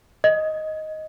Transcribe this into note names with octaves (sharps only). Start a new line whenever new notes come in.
D#5